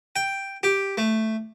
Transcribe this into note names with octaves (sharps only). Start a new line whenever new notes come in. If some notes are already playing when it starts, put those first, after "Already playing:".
G5
G4
A3